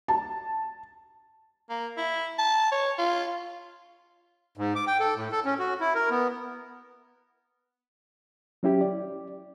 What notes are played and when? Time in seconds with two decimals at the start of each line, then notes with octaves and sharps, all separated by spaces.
0.08 A5
1.70 A#3
1.97 E4
2.38 A5
2.72 C#5
2.98 F4
4.57 G#2
4.75 D6
4.87 G5
5.00 A4
5.16 A2
5.32 A4
5.45 C#4
5.59 F#4
5.80 E4
5.95 A#4
6.10 B3
8.63 F#3 C#4 E4 G4
8.81 D5